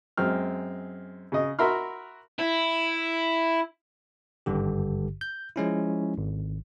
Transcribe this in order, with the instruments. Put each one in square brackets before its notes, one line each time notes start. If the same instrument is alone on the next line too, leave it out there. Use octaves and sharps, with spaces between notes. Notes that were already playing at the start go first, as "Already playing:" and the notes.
[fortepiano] F#2 G#3 C4 F6
C#3 D#5
F#4 A#4 E5 B5 C6 F6
[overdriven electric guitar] E4
[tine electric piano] G#1 G2 D3 G4
G6
F3 G#3 C#4 E4
G#1